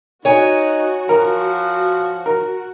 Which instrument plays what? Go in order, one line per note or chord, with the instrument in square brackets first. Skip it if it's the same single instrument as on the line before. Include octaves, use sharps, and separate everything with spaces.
[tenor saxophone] D#4 [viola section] F#4 [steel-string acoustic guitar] C#5 G#5
[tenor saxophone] F3 [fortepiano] A#4
[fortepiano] A#4